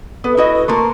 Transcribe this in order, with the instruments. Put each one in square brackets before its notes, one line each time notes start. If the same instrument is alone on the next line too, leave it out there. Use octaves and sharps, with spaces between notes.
[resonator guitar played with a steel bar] B3 [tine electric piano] A4 B4 D#6
[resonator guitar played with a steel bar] E4 F#4 D#5
[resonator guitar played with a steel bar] A3 A#3 A#4 [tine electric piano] C6 C#6